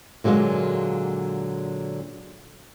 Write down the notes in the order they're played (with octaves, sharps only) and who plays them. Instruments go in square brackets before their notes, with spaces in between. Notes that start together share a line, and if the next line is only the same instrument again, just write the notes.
[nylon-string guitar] A#2 D3 F#3 G#3 F4